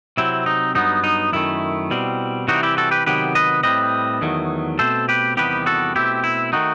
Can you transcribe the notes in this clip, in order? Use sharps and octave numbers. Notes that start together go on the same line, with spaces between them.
C3 F#3 C4 E4
D#4
G2 F#3 B3 D#4
D#4
F#2 D#3 A3 E4
B2 G3 C4
C3 E3 G3 C4 D#4 F#4
E4 G4
F#4 A4
G4 B4
C3 D#3 F#3 B3 G4 B4
B4 D#5
A2 G3 C4 B4 D#5
E2 D#3 F#3 A3
B2 A3 C4 A4 C5
G4 B4
E2 C3 D#3 G3 B3 G4 B4
F#4 A4
B2 A3 C4 E4 G4
E4
D#3 A3 D#4 F#4